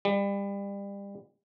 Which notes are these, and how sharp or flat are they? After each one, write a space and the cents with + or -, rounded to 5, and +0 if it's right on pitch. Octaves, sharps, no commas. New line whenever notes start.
G3 +30